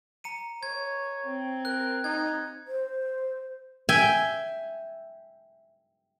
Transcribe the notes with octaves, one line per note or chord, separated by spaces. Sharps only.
A#5 C#7 D#7
C#5 G#6
C4
A#4 F#6
D#4 G#6
C5
E5 G5 G#5